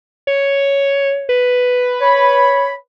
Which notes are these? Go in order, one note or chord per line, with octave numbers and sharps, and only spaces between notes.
C#5
B4
C#5 B5